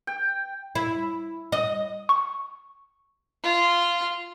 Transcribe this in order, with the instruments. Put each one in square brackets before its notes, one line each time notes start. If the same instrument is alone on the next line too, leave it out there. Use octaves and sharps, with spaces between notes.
[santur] G5
[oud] E4
D#5
[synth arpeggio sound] C#6
[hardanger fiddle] F4